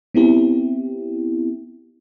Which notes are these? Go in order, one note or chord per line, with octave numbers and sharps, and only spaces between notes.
B3 C4 E4 G4